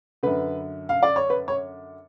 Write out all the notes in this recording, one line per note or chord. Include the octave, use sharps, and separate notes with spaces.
F#2 D3 B4
F5
D5
C#5
B4
C#5